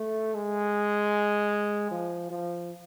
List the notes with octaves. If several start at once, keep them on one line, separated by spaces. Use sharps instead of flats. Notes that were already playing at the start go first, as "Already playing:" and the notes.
Already playing: A3
G#3
F3
F3